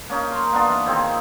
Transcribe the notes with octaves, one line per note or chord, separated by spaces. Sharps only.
A#3 C#4 D#4
A#5 C6
A#3 B3 D4 F4
E3
D#3 C4 F4 G#4